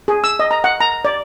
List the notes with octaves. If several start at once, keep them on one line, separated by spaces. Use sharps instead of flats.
G#4
E6
D#5
A#5
F#5
A#5
D5